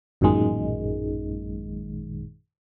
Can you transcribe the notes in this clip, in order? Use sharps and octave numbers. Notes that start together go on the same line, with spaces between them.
A1 F#2 A#2 D#3 G#3